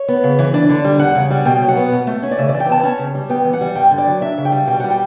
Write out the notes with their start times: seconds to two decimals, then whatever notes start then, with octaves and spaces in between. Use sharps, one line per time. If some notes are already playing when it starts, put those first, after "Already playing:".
Already playing: C#5
0.08 B3
0.23 C#3
0.39 E3
0.54 D4 D5
0.69 D3
0.84 G3
0.99 E2 F#5
1.15 C#3
1.30 G3
1.45 B2 G5
1.62 F#3
1.68 F#5
1.77 B3
1.92 B2
2.07 A3
2.23 C#4
2.31 D5
2.38 C#3 E5
2.49 D5
2.54 E3
2.60 G5
2.69 B3 A5
2.84 C#4
2.99 C#3
3.15 G3
3.29 B3 G5
3.45 E3
3.53 F#5
3.61 G3
3.75 G2 G5
3.91 D3
3.98 D5
4.07 F#3
4.21 D4 E5
4.38 C#3
4.45 G5
4.52 G3
4.67 B2 G5
4.80 G3 F#5
4.90 G5